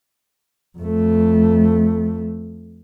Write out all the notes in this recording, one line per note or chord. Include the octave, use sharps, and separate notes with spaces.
F2 A3